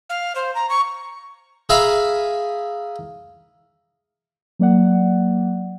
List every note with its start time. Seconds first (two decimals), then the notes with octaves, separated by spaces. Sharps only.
0.10 F5
0.35 C5
0.55 A#5
0.69 C#6
1.69 G#4 E5 F5 G#5 A#5 B5
4.59 F#3 A#3 D5 F#5